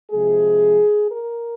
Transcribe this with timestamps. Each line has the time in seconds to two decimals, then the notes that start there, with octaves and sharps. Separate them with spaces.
0.11 C3 F3 G#3 G#4
1.12 A#4